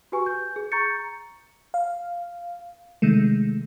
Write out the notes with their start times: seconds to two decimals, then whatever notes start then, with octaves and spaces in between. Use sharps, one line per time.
0.12 F#4 G4 B4 G#5 C#6
0.26 G6
0.56 G#4
0.72 A#5 C#6 G6 A6 C#7
1.74 F5
3.02 C3 D#3 G#3 A3